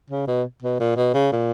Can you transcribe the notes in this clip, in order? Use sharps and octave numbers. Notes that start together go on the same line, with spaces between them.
C#3
B2
B2
A#2
B2
C#3
A#2